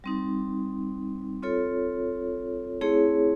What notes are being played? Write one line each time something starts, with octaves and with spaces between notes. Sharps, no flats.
G3 C4 D#4
C4 F4 A4 C#5
A3 C4 E4 G#4 C#5